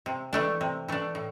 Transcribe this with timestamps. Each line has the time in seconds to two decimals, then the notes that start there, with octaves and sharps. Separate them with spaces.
0.06 C3
0.33 E3 A3 D4
0.61 C3
0.88 E3 A3 D4
1.15 A2